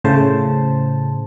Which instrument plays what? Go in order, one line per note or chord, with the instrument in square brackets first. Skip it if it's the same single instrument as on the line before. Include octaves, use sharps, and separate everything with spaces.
[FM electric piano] A2 C#3 C5 A5